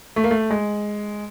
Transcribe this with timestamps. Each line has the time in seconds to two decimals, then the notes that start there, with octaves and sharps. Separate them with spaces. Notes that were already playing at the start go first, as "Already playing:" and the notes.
0.16 A3
0.24 A#3
0.31 A3
0.50 G#3